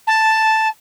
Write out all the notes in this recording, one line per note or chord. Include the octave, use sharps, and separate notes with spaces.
A5